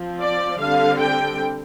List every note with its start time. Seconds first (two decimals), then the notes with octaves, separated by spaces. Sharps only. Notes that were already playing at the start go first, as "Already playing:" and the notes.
Already playing: F3 C4
0.21 D5
0.60 D3 G3 C4 F5
1.00 G5